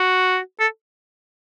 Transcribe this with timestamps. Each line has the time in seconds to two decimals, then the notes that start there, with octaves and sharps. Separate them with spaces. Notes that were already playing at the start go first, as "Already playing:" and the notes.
Already playing: F#4
0.60 A4